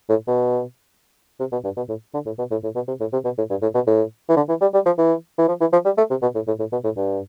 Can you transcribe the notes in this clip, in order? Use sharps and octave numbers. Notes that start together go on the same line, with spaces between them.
A2
B2
C3
B2
G2
B2
A2
D3
A2
B2
A2
A2
B2
C3
A2
C3
B2
A2
G2
A2
B2
A2
E3
D3
E3
G3
G3
F3
E3
E3
F3
E3
F3
G3
A3
C3
B2
A2
A2
A2
B2
A2
G2